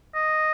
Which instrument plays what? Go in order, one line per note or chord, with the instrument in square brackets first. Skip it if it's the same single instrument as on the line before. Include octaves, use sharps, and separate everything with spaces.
[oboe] D#5